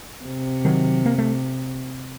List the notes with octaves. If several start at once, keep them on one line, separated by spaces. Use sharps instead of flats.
C3
D#3 F#3
A#3
A3